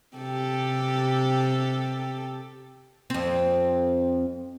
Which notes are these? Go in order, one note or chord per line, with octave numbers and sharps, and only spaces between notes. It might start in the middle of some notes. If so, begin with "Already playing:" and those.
C3 G4 A4
F2 C4